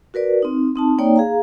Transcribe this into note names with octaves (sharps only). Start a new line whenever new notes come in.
F#4 A#4 B4 D5
C4 D#4
C4 D#4 A5
A#3 D#4 C#5 D5 G5
G#4 F5 A#5